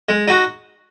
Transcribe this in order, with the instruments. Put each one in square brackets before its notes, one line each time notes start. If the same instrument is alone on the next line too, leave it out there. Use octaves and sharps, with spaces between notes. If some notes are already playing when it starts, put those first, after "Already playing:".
[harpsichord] G#3
D#4 F#4